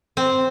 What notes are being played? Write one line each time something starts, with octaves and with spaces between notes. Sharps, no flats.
C4